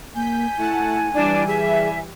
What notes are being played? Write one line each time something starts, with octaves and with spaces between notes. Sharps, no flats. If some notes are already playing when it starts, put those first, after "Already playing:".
A#3 G#5 G6 B6
A3 E4 F#5 A5
E3 G3 D4 E4
G#4 E5